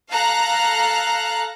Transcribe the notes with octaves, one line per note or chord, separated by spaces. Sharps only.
A4 F5 A#5 F#6